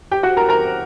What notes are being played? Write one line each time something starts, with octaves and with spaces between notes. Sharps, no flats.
G4 G5
F#4 F#5
A#4 A#5
A#4 A#5